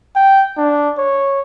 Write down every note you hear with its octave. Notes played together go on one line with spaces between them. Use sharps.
G5
D4
C#5